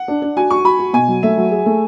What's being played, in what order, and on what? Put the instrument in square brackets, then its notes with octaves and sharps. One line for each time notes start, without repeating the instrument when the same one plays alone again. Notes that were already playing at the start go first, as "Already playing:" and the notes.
Already playing: [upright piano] F#5
[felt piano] D4
D4
[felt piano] F#4 [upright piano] G#5
[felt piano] F#4 [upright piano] C#6
[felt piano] F#4 [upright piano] B5
[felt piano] F#4
[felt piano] B2 [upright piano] G#5
[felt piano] F#3
[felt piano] A3 [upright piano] E5
[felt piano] F#3
G#4
A3